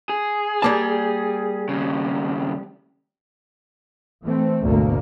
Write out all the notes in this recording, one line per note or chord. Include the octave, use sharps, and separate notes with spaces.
G#4
G3 A#3 A5
D#2 C#3
E3 A3 C4
G#1 D2 B2 A3 A#3